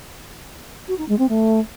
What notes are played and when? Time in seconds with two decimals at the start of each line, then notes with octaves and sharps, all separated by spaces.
0.88 F#4
0.98 D#4
1.08 G#3
1.19 C4
1.29 A3